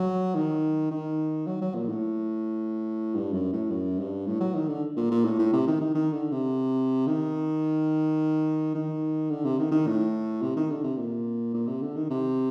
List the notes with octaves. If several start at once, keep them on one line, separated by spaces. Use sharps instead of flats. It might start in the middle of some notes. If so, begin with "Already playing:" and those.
Already playing: F#3
D#3
D#3
F#3
F#3
A#2
A2
G2
F#2
A2
F#2
G2
A2
F#3
D#3
D3
A#2
A#2
A2
A2
C3
D#3
D#3
D#3
D3
C3
D#3
D#3
D3
C3
D#3
D#3
A2
C3
D#3
D3
C3
A#2
A#2
C3
D3
D#3
C3